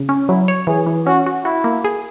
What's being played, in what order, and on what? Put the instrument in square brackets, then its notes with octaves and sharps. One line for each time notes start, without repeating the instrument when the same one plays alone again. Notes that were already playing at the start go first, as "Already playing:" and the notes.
Already playing: [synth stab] C#3
C#4
[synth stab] F#3 [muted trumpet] E4
[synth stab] C#5
[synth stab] E3 [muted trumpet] G#4
[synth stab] E3
[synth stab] C#4 [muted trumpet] F#4
[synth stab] F#4
[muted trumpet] E4 [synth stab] F#4
[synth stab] A#3
G#4